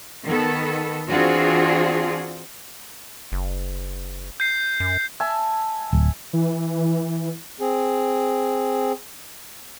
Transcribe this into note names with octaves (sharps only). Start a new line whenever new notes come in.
D#3 B3 A4
E3 C4 D4 F4 F#4 G#4
F#1
G6 C7
F#2
E5 G#5 A5
D1
E3
E3
C4 G#4